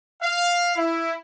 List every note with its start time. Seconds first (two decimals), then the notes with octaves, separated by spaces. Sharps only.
0.23 F5
0.76 E4